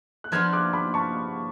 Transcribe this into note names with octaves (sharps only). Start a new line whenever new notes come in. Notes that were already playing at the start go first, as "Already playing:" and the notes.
F#6
F3 B3 D4 F4 F6 G#6
D6 F#6
B5 D6
A5 C#6